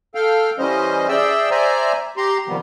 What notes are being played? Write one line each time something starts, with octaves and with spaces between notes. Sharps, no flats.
A4 F5 G5 F6
E3 G3 C#4 C5 D#5
G#4 D5 E5 G5 E6
C5 D5 E5 G#5 A#5
G4 A#5 C6
C3 D#3 F3 G3 B3